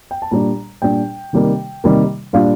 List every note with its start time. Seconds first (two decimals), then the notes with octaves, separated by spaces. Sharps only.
0.11 G5
0.22 A5
0.31 A#2 G3 D4 A#5
0.82 A#2 G3 D4 G5
1.33 C3 D#3 G3 A#3
1.84 C3 D#3 G3 A#3
2.33 A#2 G3 D4 F4 F5